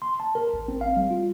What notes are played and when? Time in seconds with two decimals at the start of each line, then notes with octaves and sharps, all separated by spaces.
0.02 C6
0.20 A5
0.35 A#4
0.54 G#1
0.68 C4
0.81 F5
0.97 G3
1.11 F4